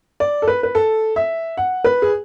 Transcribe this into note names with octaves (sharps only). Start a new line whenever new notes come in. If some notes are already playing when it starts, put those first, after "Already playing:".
D5
A4
B4
B4
A4
E5
F#5
B4
G#4